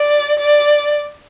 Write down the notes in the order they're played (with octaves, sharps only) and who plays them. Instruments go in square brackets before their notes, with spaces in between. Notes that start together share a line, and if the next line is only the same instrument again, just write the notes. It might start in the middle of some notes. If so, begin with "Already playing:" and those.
Already playing: [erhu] D5
D5